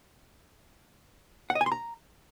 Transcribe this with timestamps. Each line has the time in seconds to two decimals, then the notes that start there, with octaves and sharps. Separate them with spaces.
1.50 F#5
1.55 D#5
1.61 G#5
1.66 C6
1.72 A#5